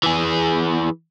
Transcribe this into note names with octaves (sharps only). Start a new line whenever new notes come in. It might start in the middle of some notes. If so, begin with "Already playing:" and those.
E3 G#4